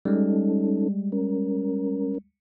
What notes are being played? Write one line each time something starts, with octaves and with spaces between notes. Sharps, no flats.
G3 G#3 C#4 D#4 A4
C#4 A#4